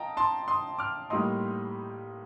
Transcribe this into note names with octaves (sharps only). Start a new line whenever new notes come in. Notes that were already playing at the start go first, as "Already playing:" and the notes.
Already playing: F4 D#5 G5 A5 A#5
A5 C6
C6 D#6
D6 F6
A2 G3 A#3 D#4 C6 D#6